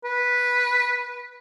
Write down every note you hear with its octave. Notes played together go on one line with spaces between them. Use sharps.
B4